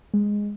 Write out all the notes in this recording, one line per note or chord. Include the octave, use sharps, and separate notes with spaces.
G#3